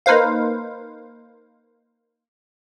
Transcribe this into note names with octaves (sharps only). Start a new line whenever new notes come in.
A#3 D#4 B4 C5 F5